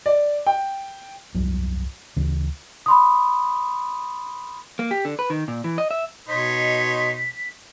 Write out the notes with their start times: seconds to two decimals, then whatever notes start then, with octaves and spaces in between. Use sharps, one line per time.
0.06 D5
0.47 G5
1.35 G1 C2 F2 F#3
2.16 D2 C#3 E3
2.86 B5 C6 D#6
4.79 A#3
4.91 G4
5.05 D3
5.19 B4
5.30 D#3
5.48 A#2
5.64 E3
5.78 D#5
5.91 E5
6.28 B2 D#4 C#5 C6 B6